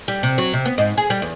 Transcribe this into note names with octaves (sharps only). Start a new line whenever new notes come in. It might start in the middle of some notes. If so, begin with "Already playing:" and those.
G3
C3
F#3
C3
B3
G#2
G#4
G3
E2